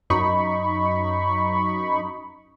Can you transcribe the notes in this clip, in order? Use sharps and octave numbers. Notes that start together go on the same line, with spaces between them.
F#2 D#4 B5 C#6